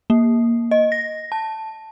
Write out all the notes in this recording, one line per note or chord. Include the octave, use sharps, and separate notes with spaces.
A#3
D#5
A#6
A5